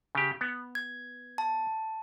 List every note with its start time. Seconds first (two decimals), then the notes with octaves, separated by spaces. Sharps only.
0.15 C#3 G4
0.41 B3
0.75 G#6
1.38 A5